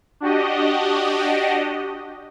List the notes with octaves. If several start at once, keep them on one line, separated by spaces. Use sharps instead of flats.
D4 F#4 G4 D#5